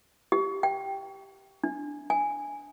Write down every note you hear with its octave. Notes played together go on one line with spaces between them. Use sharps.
G4
G5
D4
G#5